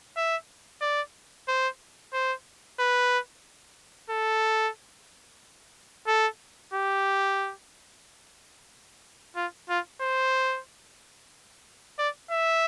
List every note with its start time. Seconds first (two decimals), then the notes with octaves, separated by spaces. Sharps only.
0.17 E5
0.82 D5
1.48 C5
2.14 C5
2.80 B4
4.10 A4
6.07 A4
6.74 G4
9.36 F4
9.69 F4
10.01 C5
11.99 D5
12.31 E5